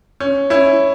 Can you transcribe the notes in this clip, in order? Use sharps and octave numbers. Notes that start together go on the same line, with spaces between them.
C#4
C#4 E4